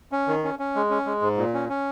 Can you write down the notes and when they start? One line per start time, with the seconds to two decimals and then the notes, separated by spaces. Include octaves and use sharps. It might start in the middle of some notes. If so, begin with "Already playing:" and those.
0.12 C#4
0.27 D#3
0.44 C#4
0.59 C#4
0.75 G#3
0.90 C#4
1.06 G#3
1.22 G#2
1.37 A#2
1.54 C#4
1.69 C#4